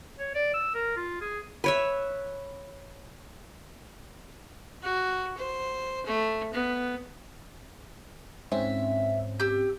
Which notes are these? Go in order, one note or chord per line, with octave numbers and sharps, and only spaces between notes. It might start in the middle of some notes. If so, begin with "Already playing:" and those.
C#5
D5
E6
A#4
F4
G#4
B4 C#5 E5
F#4
C5
A3
B3
G#2 C4 C#4 E5
G4 E6